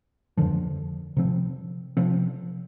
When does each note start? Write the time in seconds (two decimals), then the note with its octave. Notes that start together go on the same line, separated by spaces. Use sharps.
0.37 F2 D3 F3
1.17 C3 F3 C4
1.97 C3 F3 C4